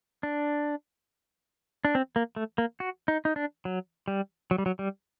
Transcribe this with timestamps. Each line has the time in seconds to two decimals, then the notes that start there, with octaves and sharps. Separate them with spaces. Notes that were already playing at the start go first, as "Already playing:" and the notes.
0.23 D4
1.85 D4
1.95 C4
2.16 A#3
2.36 A3
2.58 A#3
2.80 F#4
3.08 D#4
3.25 D#4
3.36 D4
3.65 F#3
4.08 G3
4.51 F#3
4.58 G3
4.66 F#3
4.79 G3